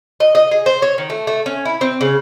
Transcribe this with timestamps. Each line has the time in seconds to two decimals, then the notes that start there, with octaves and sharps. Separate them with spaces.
0.20 D#5
0.35 D#5
0.51 G#4
0.66 C5
0.82 C#5
0.98 D#3
1.10 A3
1.27 A3
1.46 C#4
1.65 E4
1.81 C4
2.01 C#3